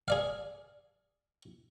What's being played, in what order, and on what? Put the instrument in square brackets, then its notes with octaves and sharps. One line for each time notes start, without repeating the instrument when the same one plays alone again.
[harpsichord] G#4 D5 F5